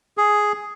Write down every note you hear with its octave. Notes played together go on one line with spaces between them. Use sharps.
G#4